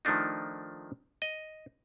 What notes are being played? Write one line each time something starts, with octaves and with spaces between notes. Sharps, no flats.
D#3 F3 A3 D4 D#4
D#5